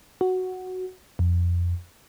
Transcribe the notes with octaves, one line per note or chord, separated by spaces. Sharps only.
F#4
F2